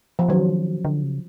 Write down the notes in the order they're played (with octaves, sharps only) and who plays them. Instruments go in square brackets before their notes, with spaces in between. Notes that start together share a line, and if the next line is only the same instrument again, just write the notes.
[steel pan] F3
[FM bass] D#3 [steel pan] F#3
[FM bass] D3
C#3